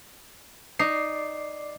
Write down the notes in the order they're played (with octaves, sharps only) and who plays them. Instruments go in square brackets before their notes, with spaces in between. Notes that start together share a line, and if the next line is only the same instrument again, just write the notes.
[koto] D#4 [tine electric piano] D5 D6 C7